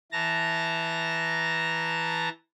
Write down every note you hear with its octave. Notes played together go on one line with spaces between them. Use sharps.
E3 A5 A#5 A#6